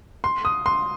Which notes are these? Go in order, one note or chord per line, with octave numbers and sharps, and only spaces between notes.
C6
D#6
C6